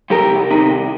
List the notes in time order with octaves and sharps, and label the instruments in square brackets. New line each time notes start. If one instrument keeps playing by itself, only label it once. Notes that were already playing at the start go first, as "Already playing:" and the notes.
[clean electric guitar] C3 F3 G4 A#4
C2
C3 D#3
C2